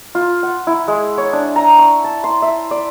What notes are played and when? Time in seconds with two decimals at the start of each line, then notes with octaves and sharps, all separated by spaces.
0.15 F4
0.43 F#5
0.67 E4
0.88 G#3
1.18 C#5
1.33 D4
1.56 A#5
1.79 C#6
2.04 A5
2.24 C6
2.42 E5
2.71 D5